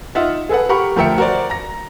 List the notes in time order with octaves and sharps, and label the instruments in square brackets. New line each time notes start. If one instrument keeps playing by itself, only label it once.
[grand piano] D#4 F4 E5 F#5
G#4 A4 B4 F#5
G4 A#4 F#5 B5 C#6
D2 F3 A#4 E5 G5 C#7
F#4 A#4 C5 D5
A#5 A#6